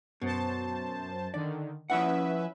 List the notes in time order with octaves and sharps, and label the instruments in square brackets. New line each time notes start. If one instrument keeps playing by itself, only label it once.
[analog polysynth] F#2 C5 A5 [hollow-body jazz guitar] B2
[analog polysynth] D3 D#3 [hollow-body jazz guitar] D5
[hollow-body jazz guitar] F3 E4 F#5 [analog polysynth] C#4 B4 E5